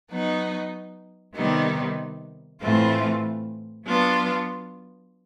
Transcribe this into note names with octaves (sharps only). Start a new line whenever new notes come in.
F#3 B3 D#4
C3 D#3 G3 B3 D#4
A2 E3 A3 C4 F4
F#3 B3 D4 F4